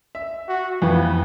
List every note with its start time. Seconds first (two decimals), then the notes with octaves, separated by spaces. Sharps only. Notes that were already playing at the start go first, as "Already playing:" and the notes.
0.15 E5
0.48 F#4
0.82 F2 E3 B3 B4